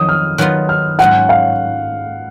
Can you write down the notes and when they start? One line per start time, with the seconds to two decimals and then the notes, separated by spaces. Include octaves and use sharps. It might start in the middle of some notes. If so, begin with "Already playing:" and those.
Already playing: F2 D#3 F#3 D#6
0.09 F6
0.38 D#3 F#3 B3 F4 F#6
0.69 F6
0.99 G#2 F#3 C#4 F4 F#5
1.29 F5